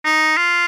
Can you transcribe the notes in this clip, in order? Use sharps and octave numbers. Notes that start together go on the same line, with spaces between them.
D#4
F4